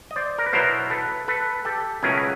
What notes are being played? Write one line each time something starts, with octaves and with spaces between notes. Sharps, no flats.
D#5
C5 D5
A#4
B4
B2 F#3 B3 E4 A#4 C5
A4 B4
A4 B4
G4 A4
C#2 B2 F#3 A3 C#4 G#4 A#4
B4